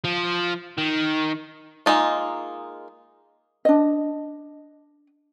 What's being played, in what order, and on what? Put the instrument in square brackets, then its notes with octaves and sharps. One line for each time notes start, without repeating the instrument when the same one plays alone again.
[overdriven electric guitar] F3
D#3
[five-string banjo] G#3 A#3 D#4 F4
[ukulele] D4 D#5